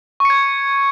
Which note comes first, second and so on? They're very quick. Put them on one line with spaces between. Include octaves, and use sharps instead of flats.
C#6 C#7 G#6